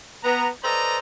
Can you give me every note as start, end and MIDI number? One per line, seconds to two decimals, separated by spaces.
0.24 0.48 59
0.24 0.48 82
0.64 0.99 69
0.64 0.99 71
0.64 0.99 72
0.64 0.99 74
0.64 0.99 75
0.64 0.99 82